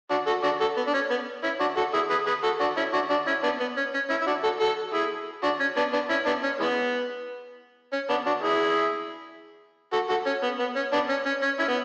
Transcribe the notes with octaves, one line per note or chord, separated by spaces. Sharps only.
D4 F#4
F#4 A4
D4 F#4
F#4 A4
B3
D4
C#4
B3
C#4 E4
D4 F#4
F#4 A4
E4 G#4
G#4 B4
G#4 B4
F#4 A4
D4 F#4
C#4 E4
D4 F#4
D4 F#4
C#4 E4
B3 D4
B3
C#4
C#4
C#4 E4
E4
D4 F#4
F#4 A4
F#4 A4
E4 G#4
D4 F#4
C#4
B3 D4
B3 D4
C#4 E4
B3 D4
C#4
E3 G#3 B3
C#4
B3 D4
D4 F#4
E4 G#4
F#4 A4
F#4 A4
C#4
B3
B3
C#4
B3 D4
C#4
C#4
C#4
C#4 E4
B3